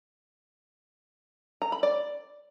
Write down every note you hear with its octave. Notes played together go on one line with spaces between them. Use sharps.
A#5
B5
D5